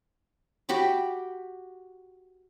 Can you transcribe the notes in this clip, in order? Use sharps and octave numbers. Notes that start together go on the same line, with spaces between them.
F#4 G4 B5 D6